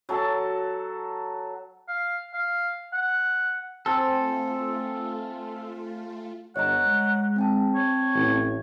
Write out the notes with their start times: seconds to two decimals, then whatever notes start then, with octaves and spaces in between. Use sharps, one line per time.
0.09 F#3 A4 A5
1.88 F5
2.33 F5
2.93 F#5
3.86 A3 C4 F4 A4 G5 G#5
6.56 G1 C#5 D#5 F#5 A#5
6.87 G#3
7.36 C4 G5 A5
7.75 C#5
8.15 A1